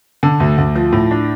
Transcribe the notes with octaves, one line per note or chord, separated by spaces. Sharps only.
D3
D2
D2
F3
A2
D4